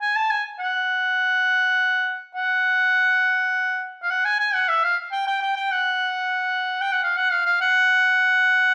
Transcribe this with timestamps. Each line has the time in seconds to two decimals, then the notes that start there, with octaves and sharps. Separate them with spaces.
0.01 G#5
0.16 A5
0.30 G#5
0.59 F#5
2.35 F#5
4.03 F5
4.10 F#5
4.25 G#5
4.39 G#5
4.54 F#5
4.68 E5
4.83 F5
5.12 G5
5.27 G5
5.42 G5
5.56 G5
5.71 F#5
6.81 G5
6.92 F#5
7.03 F5
7.17 F#5
7.32 F5
7.46 F5
7.61 F#5